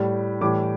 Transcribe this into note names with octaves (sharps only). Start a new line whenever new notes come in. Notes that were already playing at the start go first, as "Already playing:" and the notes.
Already playing: A2 G3
A2 E3 G3 D6